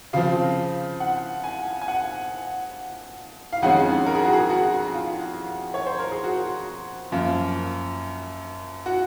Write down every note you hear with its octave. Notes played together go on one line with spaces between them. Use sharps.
C#3 F3 C4 F5
F#5
G#5
G#5
F#5
F5
F2 D#3 G#3 C#4 F#5
A#4
G#4
F#4
G#4
F#4
F4
C#5
C5
A#4
G#4
F#4
F#2 F3 A#3
F#4